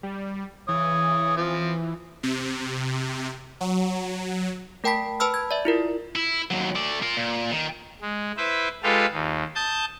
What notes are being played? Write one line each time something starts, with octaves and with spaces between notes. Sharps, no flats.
G3
E3 C#5 D#6
F3 C4
C3
F#3
A3 A#4 G5 A5 B5 B6
B4 A5 B5 E6 F6
G#6
D5 E5
E4 F4 A#4
E4
D#2 F#3
A3 D5
F4 A#4
A#2
D#3
G#3
E4 B4 C5 E5
G#3 F4 G4 A4 B4 F5
D#2
A5 D#6 G6